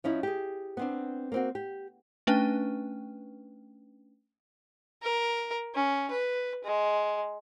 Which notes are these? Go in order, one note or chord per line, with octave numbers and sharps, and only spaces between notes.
F3 C#4 D#4 E4
G4 G#4
B3 C4 D4
A#3 C4 F#4
G4
A3 C#4 D4 B4 G5
A#4
C#4
B4
G#3